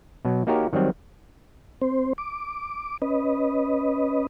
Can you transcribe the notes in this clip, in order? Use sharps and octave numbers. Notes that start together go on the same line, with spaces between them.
B2 F#3
A#3 D#4 F#4 G4 A#4 C#5
D#3 F#3 G3 C4
C4 C5
D6
C#4 B4 D#5